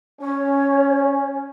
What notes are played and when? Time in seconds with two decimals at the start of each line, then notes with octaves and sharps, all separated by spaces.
0.21 C#4 C#5